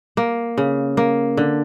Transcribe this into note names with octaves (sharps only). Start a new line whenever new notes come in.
A#3
C#3
A#3
D3